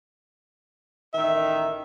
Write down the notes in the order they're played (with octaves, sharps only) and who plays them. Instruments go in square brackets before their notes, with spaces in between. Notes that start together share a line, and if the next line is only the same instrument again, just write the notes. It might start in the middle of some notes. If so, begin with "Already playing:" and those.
[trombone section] A1 D#3 [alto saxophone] E5